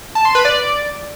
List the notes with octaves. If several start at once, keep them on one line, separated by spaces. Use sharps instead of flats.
A5
C6
B4
D5